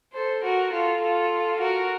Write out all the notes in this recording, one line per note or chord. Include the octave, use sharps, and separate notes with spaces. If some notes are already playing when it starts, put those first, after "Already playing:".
A4 C5
F#4 A#4
F4 A4
F4 A4
F#4 A#4